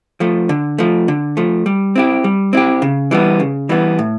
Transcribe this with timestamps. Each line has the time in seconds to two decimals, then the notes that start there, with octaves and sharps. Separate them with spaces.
0.20 F3 A3
0.49 D3
0.78 F3 A3
1.08 D3
1.37 F3 A3
1.66 G3
1.95 C4 E4 G4
2.24 G3
2.53 C4 E4 G4
2.82 C#3
3.11 E3 G3 B3
3.40 C#3
3.69 E3 G3 B3
3.99 A2